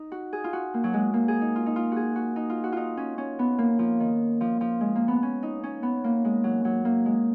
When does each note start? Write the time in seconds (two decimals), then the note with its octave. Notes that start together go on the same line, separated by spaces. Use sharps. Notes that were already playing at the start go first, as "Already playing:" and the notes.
Already playing: D#4
0.12 F#4
0.33 G#4
0.44 F4
0.53 F#4
0.74 A#3
0.84 F#3
0.93 G#3
1.14 A#3
1.28 G#4
1.41 D#4
1.56 F4
1.66 D#4
1.76 F4
1.92 F#4 G#4
2.16 F#4
2.36 D#4
2.50 F4
2.64 F#4
2.72 D#4 F4
2.97 C#4
3.18 C#4
3.39 B3
3.59 A#3
3.79 F3
4.00 D#3
4.41 F3
4.61 F3
4.81 G#3
4.96 A#3
5.08 B3
5.23 C#4
5.43 D#4
5.63 C#4
5.83 B3
6.04 A#3
6.25 G#3
6.44 F#3
6.65 F#3
6.85 A#3
7.06 G#3